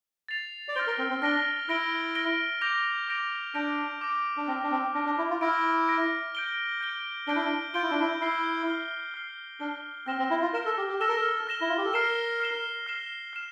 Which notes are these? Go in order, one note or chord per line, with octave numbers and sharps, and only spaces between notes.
A6 C7 F7
D5
C5 F6 A#6 D7 G7
A#4
C4
C4
D4 F6 A#6 D7 G7
E4 F6 A#6 D7 G7
F6 A#6 D7 G7
D6 G6 A#6 D7 F7
D6 G6 A#6 D7 F7
D4 D6 G6 A#6 D7 F7
D6 G6 A#6 D7 F7
D4
C4 F6 A#6 D7
D4
C4
D4 F6 A#6 D7
D4
E4
F4
E4 F6 A#6 D7
F6 A#6 D7
G6 D7 G7
G6 D7 G7
D4 G6 D7 G7
E4
D4
F4 G6 D7 G7
E4
D4
E4
E4 F6 C7 G7
F6 C7 G7
F6 C7 G7
D4 F6 C7 G7
C4 F6 A#6 E7 G7
C4
E4
F4
A#4 F6 A#6 E7 G7
A4
G4
G4
A4 F6 A#6 E7 G7
A#4
A4
F6 A#6 E7 G7
E4
F4
G4
A4
A#4 F6 C7 E7 G7
F6 C7 E7 G7
F6 C7 E7 G7
F6 C7 E7